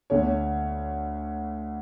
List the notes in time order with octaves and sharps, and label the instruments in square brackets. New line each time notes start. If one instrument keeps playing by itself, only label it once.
[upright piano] D2 D3 C#5